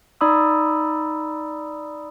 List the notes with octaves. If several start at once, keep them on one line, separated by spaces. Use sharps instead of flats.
D#4 D5 B5 D#6 E6